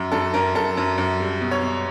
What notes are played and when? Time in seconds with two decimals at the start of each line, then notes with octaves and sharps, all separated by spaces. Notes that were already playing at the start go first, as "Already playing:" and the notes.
Already playing: F#2
0.12 F#2 A4
0.34 F#2 A#4
0.55 F#2 A4
0.77 F#2
0.98 F#2
1.20 G3
1.41 B2
1.51 C#5
1.63 B2